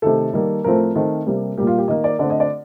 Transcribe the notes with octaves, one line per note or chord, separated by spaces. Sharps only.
C3 D#3 A3 A4
D#3 G3 A#3
A2 F3 A3 C4 A#4
D#3 A3 C4 A4
C3 G3 A#3
A#2 G3 A#3 G4
F4
G4
D#3 A#3 D#5
D5
D3 A3 C4 D5
D#5
D5